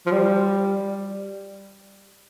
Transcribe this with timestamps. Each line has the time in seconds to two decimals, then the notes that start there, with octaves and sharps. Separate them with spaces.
0.06 F3
0.12 G3